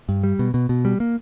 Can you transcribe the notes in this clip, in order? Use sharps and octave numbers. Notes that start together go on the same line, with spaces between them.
G2
G3
B2
B2
B2
G3
A#3